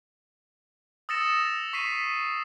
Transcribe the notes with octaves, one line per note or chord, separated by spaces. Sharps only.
D#6 E6 A6 A#6 C#7 E7
C#6 B6 C7 D#7